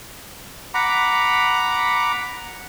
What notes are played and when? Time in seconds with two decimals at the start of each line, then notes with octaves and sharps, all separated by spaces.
0.74 F#5 A#5 B5 D6